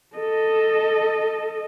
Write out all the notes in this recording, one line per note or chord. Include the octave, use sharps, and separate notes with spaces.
A4 D#5